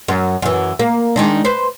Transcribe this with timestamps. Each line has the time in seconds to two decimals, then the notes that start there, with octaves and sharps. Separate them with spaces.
0.08 F#2
0.42 F#2 E3
0.79 A#3
1.16 D#3 G#3 D4
1.45 B4 C5